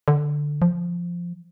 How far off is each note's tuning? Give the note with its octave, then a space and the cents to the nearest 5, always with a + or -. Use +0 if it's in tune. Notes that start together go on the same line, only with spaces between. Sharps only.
D3 +5
F3 -5